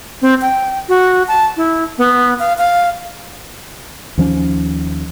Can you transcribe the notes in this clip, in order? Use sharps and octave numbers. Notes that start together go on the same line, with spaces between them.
C4
G5
F#4
A5
E4
B3
F5
F5
D#2 F3 C#4